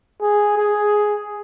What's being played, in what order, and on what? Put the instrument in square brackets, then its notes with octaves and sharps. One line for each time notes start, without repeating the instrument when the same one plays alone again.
[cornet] G#4
G#4